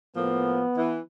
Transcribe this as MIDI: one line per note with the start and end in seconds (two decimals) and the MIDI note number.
0.17 0.62 45
0.17 0.62 53
0.17 0.62 58
0.17 0.99 59
0.78 1.00 52